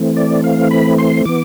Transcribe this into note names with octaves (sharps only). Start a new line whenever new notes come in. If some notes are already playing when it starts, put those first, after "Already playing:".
Already playing: E3 A3 C4
D5
F5
B5
C6
E3 B3 D6